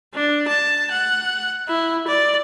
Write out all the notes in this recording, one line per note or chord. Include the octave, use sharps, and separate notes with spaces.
D4
A5
F#5
E4
D5